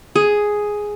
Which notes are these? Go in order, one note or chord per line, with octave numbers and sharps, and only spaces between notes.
G#4